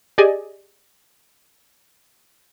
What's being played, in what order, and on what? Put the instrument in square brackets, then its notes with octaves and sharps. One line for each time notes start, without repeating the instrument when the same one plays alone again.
[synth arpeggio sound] G4 G#4 D5 D#5 G#5